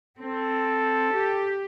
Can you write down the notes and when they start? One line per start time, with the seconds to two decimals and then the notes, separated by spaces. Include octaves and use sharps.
0.19 C4 A4
1.14 G4